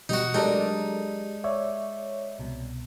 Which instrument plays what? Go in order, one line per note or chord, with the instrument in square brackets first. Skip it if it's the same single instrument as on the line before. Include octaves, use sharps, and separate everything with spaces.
[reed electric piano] B2 G3 [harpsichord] D#4 F#4
[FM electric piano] F#3 A4 A#4 [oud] G#3 D4 [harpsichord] D#4 [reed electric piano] G4
[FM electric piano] C#5 [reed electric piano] D5 E5
[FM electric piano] C2 B2